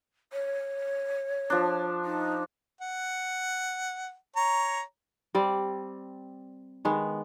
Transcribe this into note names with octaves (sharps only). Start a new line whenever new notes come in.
C#5
F3 D4
D#4
F#5
C#5 A#5
G3 C4 D5
D#3 G#3 B3